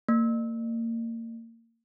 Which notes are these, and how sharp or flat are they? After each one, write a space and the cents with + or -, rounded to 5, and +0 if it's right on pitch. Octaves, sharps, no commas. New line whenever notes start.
A#3 -30